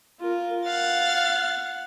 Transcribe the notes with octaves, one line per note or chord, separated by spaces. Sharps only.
F4 A#4
F5 F#5 A6